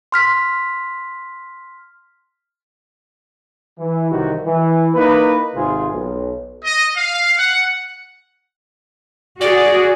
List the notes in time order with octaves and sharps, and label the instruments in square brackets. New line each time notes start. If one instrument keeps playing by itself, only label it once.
[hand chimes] C6 F6 B6
[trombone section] E3
C2 C3 D#3 F#4 G4
E3
A#3 D#4 E4 B4
G#1 G#2 C3 F4 G#4
B1
[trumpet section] D#5
F5
F#5
[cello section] F#4 G#4 [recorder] D5